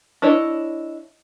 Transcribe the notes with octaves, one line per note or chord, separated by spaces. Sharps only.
D4 E4 C#5 D#5